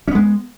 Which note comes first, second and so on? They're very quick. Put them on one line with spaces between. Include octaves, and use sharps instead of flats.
C#4 B3 G#3